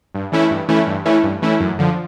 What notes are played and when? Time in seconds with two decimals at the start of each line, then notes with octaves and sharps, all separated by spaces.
0.15 G2
0.32 E3 A3 C#4 E4
0.51 G2
0.69 E3 A3 C#4 E4
0.87 G2
1.05 E3 A3 C#4 E4
1.23 G2
1.42 E3 A3 C#4 E4
1.60 F#2
1.79 D3 F3